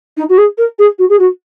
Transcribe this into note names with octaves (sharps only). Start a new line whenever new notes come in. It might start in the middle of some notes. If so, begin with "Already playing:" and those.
D#4
F#4
G#4
A#4
G#4
F#4
G#4
F#4